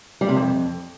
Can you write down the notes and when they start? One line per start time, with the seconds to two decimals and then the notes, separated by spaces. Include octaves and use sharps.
0.21 G3
0.29 C3
0.36 F2